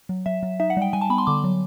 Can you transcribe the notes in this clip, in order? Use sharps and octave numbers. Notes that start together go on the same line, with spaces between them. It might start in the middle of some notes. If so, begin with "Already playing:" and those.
F#3
F#3 E5
F#3
D#4 E5
F#5
G3 G5
G3 G#5
A5
B3 B5
C6
D3 D6
F#3